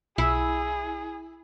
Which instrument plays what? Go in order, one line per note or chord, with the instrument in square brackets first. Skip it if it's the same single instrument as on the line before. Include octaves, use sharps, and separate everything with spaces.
[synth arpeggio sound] B1 [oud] E4 [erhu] G#4